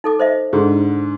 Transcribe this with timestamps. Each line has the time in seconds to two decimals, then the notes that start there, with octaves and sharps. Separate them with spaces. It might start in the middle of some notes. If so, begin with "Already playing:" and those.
0.04 D#4 A4 D6
0.20 C5 D#5 E5
0.53 G#2 D3